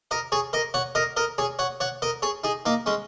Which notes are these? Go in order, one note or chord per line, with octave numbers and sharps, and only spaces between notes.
A#4 D#5
G#4 C#5
A#4 D#5
C#5 F#5
A#4 D#5
A#4 D#5
G#4 C#5
C#5 F#5
C#5 F#5
A#4 D#5
G#4 C#5
D#4 G#4
A#3 D#4
G#3 C#4